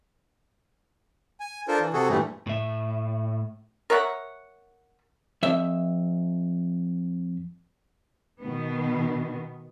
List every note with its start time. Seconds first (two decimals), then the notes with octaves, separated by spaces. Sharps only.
1.40 G#5
1.68 D4 F4 A4 A#4 C5
1.80 E3
1.93 C3 F#4 G#4 A4
2.09 G2 A#2 E3 G3 A3
2.47 A2 E5
3.90 A#4 C#5 E5 F#5
5.43 F2 E5
8.42 B2 D#3 B3